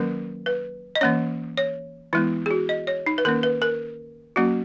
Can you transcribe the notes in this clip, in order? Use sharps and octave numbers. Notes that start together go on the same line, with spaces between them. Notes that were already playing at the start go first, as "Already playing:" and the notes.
Already playing: D#3 F#3 A#3 C#4 A#4
B4
D#5
E3 A#3 C#4 C#5
C#5
E3 G#3 B3 E4
G#4
F#4
D#5
C#5
D#4
B4
D#3 A#3 C#4 A#4
B4
A#4
F#3 A#3 C#4 F#4